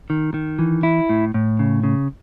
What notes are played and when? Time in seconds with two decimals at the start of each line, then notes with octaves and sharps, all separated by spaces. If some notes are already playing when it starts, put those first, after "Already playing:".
0.10 D#3
0.34 D#3
0.59 E3
0.83 E4
1.09 A2
1.34 A2
1.59 C#3
1.84 C#3